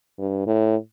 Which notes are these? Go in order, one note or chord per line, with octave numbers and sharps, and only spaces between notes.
G2
A2